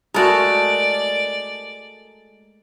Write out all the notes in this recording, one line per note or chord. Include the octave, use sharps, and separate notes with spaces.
G#3 A3 F#4 A#4 D5 A5